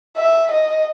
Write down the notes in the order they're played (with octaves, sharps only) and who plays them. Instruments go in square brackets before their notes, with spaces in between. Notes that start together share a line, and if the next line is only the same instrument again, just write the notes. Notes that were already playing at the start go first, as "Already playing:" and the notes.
[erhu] E5
D#5